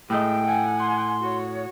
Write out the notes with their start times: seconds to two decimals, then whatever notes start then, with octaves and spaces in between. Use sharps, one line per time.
0.10 A2 G#3 A3 D#5 G5
0.46 F#5 G#5
0.79 C6
1.21 F#4 C#5